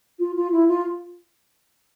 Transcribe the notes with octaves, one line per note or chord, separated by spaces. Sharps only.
F4
F4
E4
F4